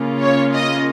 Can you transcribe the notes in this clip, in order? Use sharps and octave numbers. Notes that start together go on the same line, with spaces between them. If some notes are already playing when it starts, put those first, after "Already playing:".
Already playing: C#3 A#3 C#4 F4
C#5
D#5